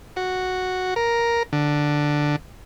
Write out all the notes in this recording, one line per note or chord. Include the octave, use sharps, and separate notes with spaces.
F#4
A#4
D3